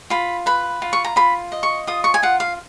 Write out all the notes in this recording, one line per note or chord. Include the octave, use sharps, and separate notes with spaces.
F4 B5
B4 B5
F4
C#6
A#5
F4 B5
D#5
C#6
F4 D#6
C#6
G#5
F4 F#5
F5